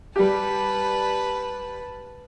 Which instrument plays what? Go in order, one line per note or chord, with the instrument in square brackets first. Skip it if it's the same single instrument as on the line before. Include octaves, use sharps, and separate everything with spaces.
[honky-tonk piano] G3 G4 [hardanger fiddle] B4 A5